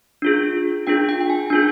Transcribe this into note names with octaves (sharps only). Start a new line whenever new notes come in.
D4 F4 G#4
D4 F4 G#4 G5
G5
G5
G#5
D4 F4 G#4 G#5